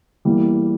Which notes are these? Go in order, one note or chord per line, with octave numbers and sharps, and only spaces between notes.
E2 E3 G3 A#3 E4